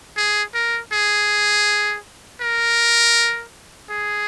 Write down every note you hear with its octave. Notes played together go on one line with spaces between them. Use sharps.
G#4
A#4
G#4
A#4
G#4